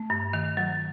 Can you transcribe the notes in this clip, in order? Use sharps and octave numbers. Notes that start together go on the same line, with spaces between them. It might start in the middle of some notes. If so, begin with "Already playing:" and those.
Already playing: A3
G2
D#3
F#3